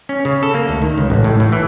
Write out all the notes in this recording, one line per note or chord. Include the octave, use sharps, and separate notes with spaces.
C#4
C#3
A4
A#3
D2
D#3
C#2
A1
A2
A2
E3